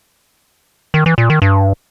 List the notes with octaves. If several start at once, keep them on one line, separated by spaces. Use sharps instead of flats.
D#3
E3
A#2
D#3
G2